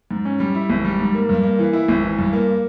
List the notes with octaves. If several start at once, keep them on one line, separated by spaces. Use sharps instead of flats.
G#2
C#4
G3
E4
G#1
G3
G#2
A#3
G2
A#3
E3
E4
G#1
E3
G2
A#3